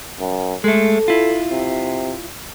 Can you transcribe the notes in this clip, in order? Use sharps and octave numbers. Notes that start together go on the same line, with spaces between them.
F#2
G#3 A3 A4
E4 F4
C3